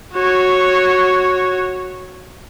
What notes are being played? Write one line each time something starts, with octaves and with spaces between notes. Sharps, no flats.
F#4 C#5